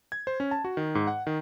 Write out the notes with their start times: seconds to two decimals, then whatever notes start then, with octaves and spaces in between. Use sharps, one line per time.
0.12 G#6
0.27 C5
0.40 C#4
0.51 A5
0.64 F#4
0.77 D#3
0.95 G#2
1.07 F#5
1.27 D#3